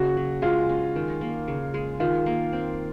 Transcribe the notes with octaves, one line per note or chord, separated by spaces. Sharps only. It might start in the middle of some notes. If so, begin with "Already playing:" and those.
Already playing: C#3 A#3 F#4
F#3
G#3 F4
C#4
D#3
A#3
C#3
G#3
D#3 F4
A#3
C4